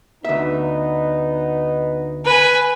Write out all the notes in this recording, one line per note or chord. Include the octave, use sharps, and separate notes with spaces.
D2 B3 D#4 E5
B4 G#5